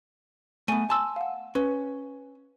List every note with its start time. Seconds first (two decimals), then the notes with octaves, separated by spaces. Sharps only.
0.68 A3 B3 G#5 D#7
0.90 G#5 A5 C6 E6
1.16 F5 F#5
1.55 C#4 B4